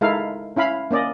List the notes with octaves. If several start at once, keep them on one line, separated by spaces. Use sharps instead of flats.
G#3 D#4 E4 A4 A#4 F5
C#4 E4 F5 B5
A#3 C#4 D5 D#5